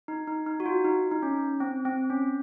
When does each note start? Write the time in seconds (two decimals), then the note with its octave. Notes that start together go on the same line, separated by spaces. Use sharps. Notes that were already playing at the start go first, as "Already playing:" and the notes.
0.08 D#4
0.27 D#4
0.46 D#4
0.60 F#4
0.66 F4
0.85 D#4
1.11 D#4
1.23 C#4
1.60 C4
1.85 C4
2.10 C#4